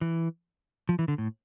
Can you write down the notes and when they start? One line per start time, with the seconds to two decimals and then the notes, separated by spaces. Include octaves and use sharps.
0.01 E3
0.89 F3
0.99 E3
1.08 D3
1.18 A2